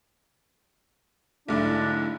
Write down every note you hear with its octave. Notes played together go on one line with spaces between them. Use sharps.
B1 G#2 D3 A3 D4 E4